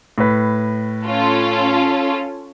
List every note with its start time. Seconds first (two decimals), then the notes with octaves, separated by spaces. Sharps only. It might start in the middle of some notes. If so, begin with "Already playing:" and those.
0.18 A2 B4
1.05 C#4 F4 A4